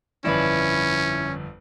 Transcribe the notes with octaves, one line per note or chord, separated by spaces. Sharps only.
G1 F2 C#4 E4 B4 D5